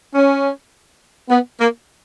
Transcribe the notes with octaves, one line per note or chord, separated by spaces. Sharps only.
C#4
B3
A#3